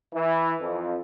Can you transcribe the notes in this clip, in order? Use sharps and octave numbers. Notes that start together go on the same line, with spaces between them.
E3
F2